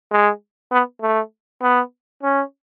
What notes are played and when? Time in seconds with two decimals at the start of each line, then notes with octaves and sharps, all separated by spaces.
0.11 G#3
0.72 B3
1.02 A3
1.62 B3
2.23 C#4